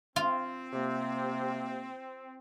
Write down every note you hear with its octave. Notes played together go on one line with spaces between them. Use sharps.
C4 F4
C3 A#3